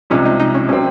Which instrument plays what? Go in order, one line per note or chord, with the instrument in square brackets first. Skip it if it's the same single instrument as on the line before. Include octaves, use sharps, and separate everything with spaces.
[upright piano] C2 C3 F3 G#3 [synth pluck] C#4
[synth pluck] D#4
D#4
C#4
[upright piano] C3 F#3 C4 [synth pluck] C#4